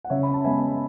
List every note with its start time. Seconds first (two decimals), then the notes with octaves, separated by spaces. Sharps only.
0.05 F#5
0.10 C#3 C#5 E5
0.23 B5
0.34 A5
0.44 G#3 B3 E5 G#5